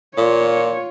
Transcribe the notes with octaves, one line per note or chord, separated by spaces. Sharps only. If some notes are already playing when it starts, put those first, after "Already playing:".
A#2 F4 C#5